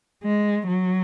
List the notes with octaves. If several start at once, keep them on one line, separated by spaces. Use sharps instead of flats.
G#3
F#3